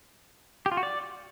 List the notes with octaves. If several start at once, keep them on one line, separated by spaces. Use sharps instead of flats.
G4
F4
F#4
D5